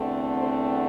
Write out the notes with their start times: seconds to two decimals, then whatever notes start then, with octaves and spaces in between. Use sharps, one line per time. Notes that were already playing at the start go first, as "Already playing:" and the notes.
Already playing: E2 D3 A3 C4
0.37 A4 C5